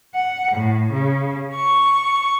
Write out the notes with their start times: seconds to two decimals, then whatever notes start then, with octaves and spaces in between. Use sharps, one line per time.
0.15 F#5
0.51 A2
0.93 C#3
1.54 C#6